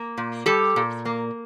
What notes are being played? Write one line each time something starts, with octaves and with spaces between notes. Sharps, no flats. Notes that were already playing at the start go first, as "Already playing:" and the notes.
Already playing: A#3
A#2
G3 G4 A4
A#2
A#3